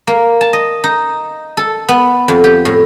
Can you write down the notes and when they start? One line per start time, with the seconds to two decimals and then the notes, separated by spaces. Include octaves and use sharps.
0.07 A#3
0.41 A5
0.53 D#5
0.84 D#4
1.57 A4
1.89 B3
2.28 F2
2.44 G4
2.65 A2